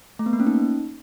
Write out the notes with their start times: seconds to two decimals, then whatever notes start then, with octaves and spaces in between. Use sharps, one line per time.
0.19 A3
0.26 B3
0.33 A#3
0.40 C#4
0.47 D#4